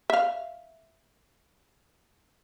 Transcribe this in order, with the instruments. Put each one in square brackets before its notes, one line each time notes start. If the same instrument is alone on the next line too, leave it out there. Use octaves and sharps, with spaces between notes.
[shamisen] E5 F5